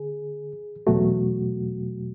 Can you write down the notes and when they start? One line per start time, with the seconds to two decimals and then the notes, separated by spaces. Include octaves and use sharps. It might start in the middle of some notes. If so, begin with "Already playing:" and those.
Already playing: D3 G#4
0.87 E2 B2 F#3 A3 F#4